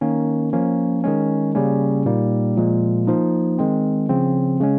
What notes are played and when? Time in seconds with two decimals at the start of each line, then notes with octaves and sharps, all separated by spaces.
0.01 D#3 A#3 C#4
0.53 F3 A#3 C#4
1.04 D#3 G#3 C#4
1.55 C#3 G3 A#3 C#4
2.05 A#2 G3 A#3 D#4
2.57 A#2 F3 G#3
3.07 F3 A#3 D#4
3.58 D#3 G#3 C4
4.09 C#3 F3 C4
4.60 C#3 G#3 C#4